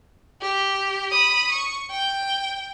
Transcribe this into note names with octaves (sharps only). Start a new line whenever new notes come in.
G4
B5 D#6
C#6
G5